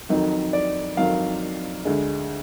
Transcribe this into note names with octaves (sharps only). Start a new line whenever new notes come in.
F2 D#3 F#3 D#4
D5
F2 D#3 F#3 F5
D2 D3 G#3